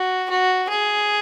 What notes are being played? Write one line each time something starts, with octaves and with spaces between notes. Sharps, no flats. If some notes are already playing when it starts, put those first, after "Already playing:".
Already playing: F#4
F#4
G#4